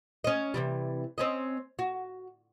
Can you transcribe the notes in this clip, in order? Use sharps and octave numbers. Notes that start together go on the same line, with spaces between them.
C#4 D#5
C3 E3 G3
C4 C#4 D#5
F#4